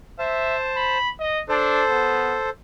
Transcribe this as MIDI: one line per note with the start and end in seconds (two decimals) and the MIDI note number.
0.19 0.98 72
0.19 0.56 76
0.19 0.98 81
0.76 1.09 83
1.20 1.42 75
1.49 1.85 62
1.49 2.50 69
1.49 2.50 72
1.90 2.36 59